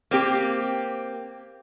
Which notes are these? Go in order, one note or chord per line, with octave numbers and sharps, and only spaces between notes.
A#3 C4 G4